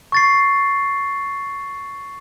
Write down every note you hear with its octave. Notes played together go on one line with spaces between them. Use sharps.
C#6 A6 C7